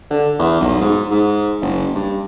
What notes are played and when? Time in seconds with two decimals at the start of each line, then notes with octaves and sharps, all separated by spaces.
0.11 D3
0.39 E2
0.61 B1
0.81 G#2
1.11 G#2
1.62 F#1
1.95 G2